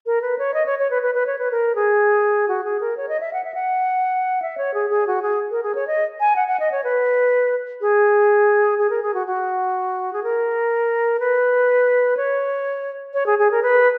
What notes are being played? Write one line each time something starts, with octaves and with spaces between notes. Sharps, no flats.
A#4
B4
C#5
D#5
C#5
C#5
B4
B4
B4
C#5
B4
A#4
G#4
F#4
G#4
A#4
C#5
D#5
E5
F#5
E5
F#5
E5
C#5
G#4
G#4
F#4
G#4
A#4
G#4
C#5
D#5
G#5
F#5
F#5
D#5
C#5
B4
G#4
G#4
A#4
G#4
F#4
F#4
G#4
A#4
B4
C#5
C#5
G#4
G#4
A#4
B4